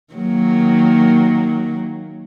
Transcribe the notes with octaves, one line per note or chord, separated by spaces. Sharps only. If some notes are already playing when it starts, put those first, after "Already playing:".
D#3 F#3 A#3